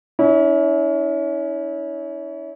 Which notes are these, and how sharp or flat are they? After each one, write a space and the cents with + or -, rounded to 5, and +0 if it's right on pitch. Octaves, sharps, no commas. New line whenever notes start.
C#4 +30 E4 -35